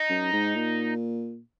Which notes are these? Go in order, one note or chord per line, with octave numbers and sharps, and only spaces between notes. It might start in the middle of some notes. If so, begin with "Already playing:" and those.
Already playing: D#4
F#2
G#2
A#2